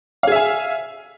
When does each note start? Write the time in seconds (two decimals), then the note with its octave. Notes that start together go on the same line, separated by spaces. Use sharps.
0.23 F5
0.27 G#4
0.32 E5
0.36 G#5